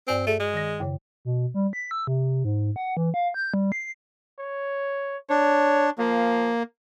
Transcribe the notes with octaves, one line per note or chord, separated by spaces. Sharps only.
G2 C4 D5 G#5
A3 G#4
G#3
D#3 A#6
F#2 C#3 C#5
B2
G3
B6
E6
C3
G#2
F#5
E3
F5
G6
G3
C7
C#5
D4 C#5
F3 A#3